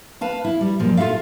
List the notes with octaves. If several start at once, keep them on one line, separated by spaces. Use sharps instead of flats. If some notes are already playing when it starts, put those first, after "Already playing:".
B4 F5 A5
E4
G3
F#2 A#2 F3
F4 F#4 A4 E5 F5